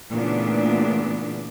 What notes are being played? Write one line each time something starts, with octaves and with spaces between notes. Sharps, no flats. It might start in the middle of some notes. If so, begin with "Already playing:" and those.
A#2 C#3 E3 A3 B3 D4